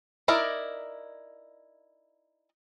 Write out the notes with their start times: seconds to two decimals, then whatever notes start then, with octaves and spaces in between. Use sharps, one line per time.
0.28 D#4 E4 A#4 D5